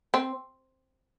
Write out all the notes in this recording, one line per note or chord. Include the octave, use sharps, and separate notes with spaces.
C4